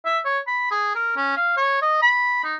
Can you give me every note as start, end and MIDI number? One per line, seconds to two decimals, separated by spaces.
0.05 0.19 76
0.25 0.39 73
0.47 0.66 83
0.71 0.94 68
0.95 1.15 70
1.16 1.32 61
1.37 1.54 77
1.57 1.80 73
1.82 1.98 75
2.02 2.41 83
2.44 2.56 63